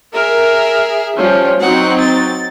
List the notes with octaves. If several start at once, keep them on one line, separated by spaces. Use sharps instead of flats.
G#4 A#4 E5
F3 G3 C#4
F#3 C4 D#4 F#5
A6